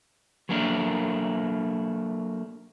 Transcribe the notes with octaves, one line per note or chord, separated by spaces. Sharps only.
F#3 A3 A#3 D4 A#4